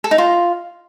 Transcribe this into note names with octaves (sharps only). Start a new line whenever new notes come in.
A4
D#4
F4